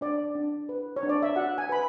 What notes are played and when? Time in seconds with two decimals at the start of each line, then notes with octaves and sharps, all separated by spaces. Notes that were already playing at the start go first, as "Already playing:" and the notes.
0.01 D4 D5
0.35 D4
0.69 B4
0.96 C#5
1.03 D4
1.09 D5
1.23 E5
1.36 F#4 F#5
1.58 G#5
1.69 B4 B5